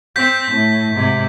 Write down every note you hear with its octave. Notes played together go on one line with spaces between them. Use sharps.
C4 G6 B6
A2
G#2 C3